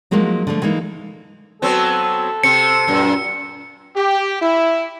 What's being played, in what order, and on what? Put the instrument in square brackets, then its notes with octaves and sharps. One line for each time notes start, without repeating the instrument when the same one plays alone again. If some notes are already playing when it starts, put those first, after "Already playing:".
[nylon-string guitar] F3 F#3 G#3 A#3 D#4
D3 F3 A3
E3 G#3 A#3 D#4
[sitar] F#3 B3 C4 [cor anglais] A4
[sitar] C3 C4 [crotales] C#7
[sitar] F#2 A#2
[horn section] G4
E4